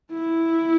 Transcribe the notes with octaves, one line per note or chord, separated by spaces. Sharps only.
E4